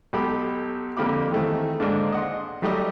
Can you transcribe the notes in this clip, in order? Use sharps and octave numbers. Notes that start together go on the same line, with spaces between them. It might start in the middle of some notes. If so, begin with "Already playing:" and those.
B1 G4 A4 B5
F2 D3 A#3 G4 B5 D6
D#3 E3 A3 C4
G#2 D3 A#3 D4
D#5 F#5 C6
F#3 G3 A3 D#4 G4 D#5